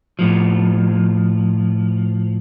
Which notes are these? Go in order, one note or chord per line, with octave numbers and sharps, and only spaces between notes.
A2 F3